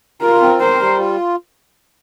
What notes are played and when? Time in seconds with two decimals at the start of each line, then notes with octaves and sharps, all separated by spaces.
0.22 F4 A#4
0.41 C4
0.60 A#4 C5
0.79 G3
0.98 F4